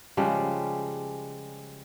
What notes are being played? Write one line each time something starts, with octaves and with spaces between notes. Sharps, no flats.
C#3 F3 G3 G#3